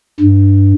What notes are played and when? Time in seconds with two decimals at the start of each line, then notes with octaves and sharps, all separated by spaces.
0.20 G2